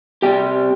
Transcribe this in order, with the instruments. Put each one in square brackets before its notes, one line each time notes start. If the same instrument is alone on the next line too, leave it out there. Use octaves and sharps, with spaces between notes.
[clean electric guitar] C3 G3 C4 G4 G5